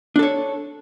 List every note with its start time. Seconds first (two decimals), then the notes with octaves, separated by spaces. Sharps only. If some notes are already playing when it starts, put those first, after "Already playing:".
0.16 D4
0.19 A4
0.23 C#5